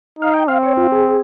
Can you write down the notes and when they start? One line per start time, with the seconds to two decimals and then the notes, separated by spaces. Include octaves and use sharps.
0.19 D#4 F5
0.34 G5
0.48 C4 F5
0.63 C#5
0.77 F4
0.92 G#4